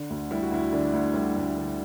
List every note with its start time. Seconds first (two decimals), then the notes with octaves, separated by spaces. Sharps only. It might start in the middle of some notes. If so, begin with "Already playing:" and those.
Already playing: D3
0.10 D2
0.31 G3 E4
0.42 F#4
0.51 D2 E4
0.72 D3 D4
0.93 D2
1.14 G3
1.36 D2
1.57 D3